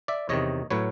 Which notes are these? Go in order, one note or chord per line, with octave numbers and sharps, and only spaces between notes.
D5 E5
E2 C3 D#3 C#5 D#5
A2 F#3 B4 C#5